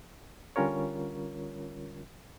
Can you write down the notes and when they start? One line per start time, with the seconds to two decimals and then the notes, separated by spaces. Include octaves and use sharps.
0.56 D3 G3 C#4 F4 A#4 C#5